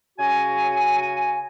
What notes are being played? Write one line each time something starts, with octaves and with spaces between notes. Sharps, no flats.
C#3 F#4 G#5